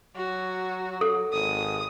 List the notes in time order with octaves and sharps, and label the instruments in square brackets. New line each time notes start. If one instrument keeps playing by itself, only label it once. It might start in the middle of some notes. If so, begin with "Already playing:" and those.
[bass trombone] F#3 [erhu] F#4
[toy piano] A4
[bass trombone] G#1 [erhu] D#6